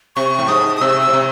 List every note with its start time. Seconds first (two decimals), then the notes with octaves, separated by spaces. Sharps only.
0.16 C3 C#6
0.39 A2
0.48 G#2 D#6
0.77 D#6
0.81 C3 E6
1.02 E6
1.09 A2
1.13 C3